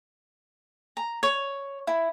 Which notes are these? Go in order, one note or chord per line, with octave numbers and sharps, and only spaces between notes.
A#5
C#5
E4